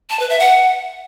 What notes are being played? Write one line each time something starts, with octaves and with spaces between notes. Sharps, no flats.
A5
B4
E5
F#5